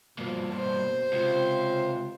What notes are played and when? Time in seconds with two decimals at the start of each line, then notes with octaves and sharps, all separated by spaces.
0.19 G2 B2 F3 A#3
0.56 B2 C5
1.13 C#2 C3 F4